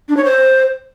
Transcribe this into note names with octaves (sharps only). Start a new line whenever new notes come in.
D4
C#5
C5